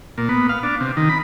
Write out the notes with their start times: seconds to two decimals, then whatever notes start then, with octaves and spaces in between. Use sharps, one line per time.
0.18 A#2
0.29 B3
0.49 F5
0.63 D4
0.81 C3
0.97 D#3
1.09 B5